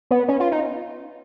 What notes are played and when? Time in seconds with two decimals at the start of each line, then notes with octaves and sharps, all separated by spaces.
0.11 B3
0.28 C#4
0.40 F4
0.52 D#4